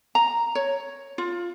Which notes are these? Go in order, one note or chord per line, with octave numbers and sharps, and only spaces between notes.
A#5
C#5
F4